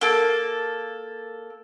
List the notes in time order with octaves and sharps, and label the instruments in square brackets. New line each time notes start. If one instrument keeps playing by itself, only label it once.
[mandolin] A#3 A4